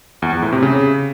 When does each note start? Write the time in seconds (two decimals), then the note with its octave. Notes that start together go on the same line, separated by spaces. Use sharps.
0.22 E2
0.32 E2
0.42 A2
0.52 C3
0.62 C#3